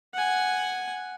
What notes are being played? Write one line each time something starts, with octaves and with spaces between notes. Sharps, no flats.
F#5 G#5